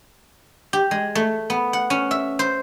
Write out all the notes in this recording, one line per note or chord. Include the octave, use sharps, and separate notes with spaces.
G4
G#3
A3
B3
F#5
C#4
E5
C5